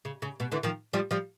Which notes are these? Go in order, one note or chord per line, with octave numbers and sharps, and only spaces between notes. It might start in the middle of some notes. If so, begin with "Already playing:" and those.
C#3
C#3
B2
D3 E3
D#3 F3
F3 G3
F3 G3